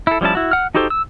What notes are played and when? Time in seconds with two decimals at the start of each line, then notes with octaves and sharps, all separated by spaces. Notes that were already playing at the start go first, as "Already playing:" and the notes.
0.07 E4 A4
0.21 F3 G3 C#4 E4 A5
0.35 E4 F#4
0.51 F#5 F6
0.75 D#4 F#4 G4 A4 C5
0.90 E6